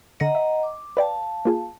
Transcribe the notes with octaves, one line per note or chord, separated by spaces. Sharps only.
D3 D#5 F#5 A#5 A#6 C#7
E5
D6
B4 D5 F5 G5 A5
A#3 F4 G#4